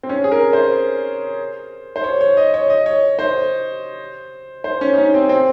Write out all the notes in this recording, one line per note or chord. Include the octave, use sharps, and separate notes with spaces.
C4
C#4
G#4
A#4
C5
C5
C#5
C#5
D#5
C#5
D#5
C#5
C5
C5
C#4
D#4
C#4
C4
C4